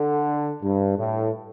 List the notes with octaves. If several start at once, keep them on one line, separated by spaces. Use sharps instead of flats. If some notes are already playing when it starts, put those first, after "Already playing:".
Already playing: D3
G2
A2